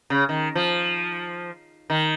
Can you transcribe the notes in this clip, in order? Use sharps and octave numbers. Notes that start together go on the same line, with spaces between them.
C#3
D#3
F3
D#3